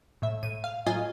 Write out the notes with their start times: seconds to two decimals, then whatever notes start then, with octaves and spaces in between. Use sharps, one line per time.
0.22 A2 E5
0.43 A2 D#7
0.64 F5
0.86 A2 F#3 F4 D#5 G#5